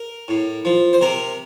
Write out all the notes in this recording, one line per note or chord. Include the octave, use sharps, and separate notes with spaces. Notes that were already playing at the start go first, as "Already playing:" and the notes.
Already playing: A#4
A2
F3
C5
C3 A#4